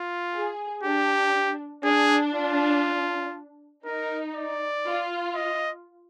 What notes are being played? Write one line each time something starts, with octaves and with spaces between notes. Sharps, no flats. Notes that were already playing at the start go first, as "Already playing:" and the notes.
Already playing: F4
G#4
D4 G4
D4 G#4
F4
D#4 A#4
D5
F4
D#5